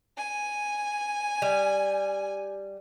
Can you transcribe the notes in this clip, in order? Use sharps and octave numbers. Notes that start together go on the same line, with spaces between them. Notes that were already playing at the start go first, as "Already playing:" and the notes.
G#5
G3